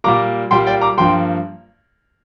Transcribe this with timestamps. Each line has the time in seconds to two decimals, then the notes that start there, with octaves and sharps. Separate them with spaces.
0.04 A#2 G3 A#3 A#5 D6
0.51 A#2 G3 A#3 G5 C6
0.67 D5 G5
0.81 A#5 D6
0.97 G2 F3 A#3 G5 C6